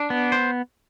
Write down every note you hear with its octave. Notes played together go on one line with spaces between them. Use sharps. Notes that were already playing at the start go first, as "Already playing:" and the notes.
Already playing: D4
B3
C5